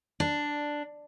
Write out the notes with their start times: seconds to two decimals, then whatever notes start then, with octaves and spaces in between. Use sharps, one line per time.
0.20 D4